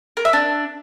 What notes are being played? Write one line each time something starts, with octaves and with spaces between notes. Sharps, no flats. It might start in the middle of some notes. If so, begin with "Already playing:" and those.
A#4
E5
D4